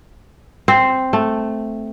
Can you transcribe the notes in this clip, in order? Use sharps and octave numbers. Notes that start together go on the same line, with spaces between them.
C4
A3